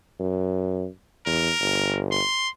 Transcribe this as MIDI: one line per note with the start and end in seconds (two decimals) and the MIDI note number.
0.20 0.86 42
1.26 1.51 40
1.26 1.99 70
1.61 2.19 31
2.12 2.49 84